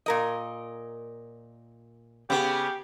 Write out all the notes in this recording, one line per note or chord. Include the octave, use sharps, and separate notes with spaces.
A#2 A#4 D#5
C#3 B3 G4